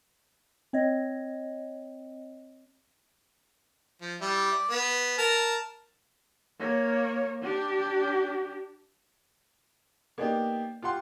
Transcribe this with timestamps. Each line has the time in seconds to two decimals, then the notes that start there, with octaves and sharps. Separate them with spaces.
0.73 C4 C#5 D#5
4.01 F3
4.21 G3 E4
4.52 D5
4.70 B3
5.18 A#4 A5
6.59 A#3 C#5
7.42 D4 G4
10.18 A#3 B3 D4 D#4 G4
10.82 F4 G4 F#5 C6